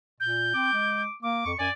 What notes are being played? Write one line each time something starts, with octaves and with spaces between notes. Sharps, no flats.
A#2 G6
C4 D6
G#3
A#3 D6
F2 C#6
F#2 D5 G#5